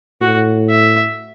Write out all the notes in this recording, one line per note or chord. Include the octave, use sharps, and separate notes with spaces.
A2 F#4
E5